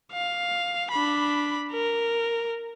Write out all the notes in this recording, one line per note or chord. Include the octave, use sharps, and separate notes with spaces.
F5
D4 B5
A#4